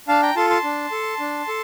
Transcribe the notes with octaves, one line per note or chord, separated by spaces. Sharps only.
D4 F5 A5
G5 A#5
F4 A4 A5 C6
A5 C6
D4
A4
D4
A4